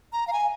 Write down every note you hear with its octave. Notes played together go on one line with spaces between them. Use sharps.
A#5
F5
G#5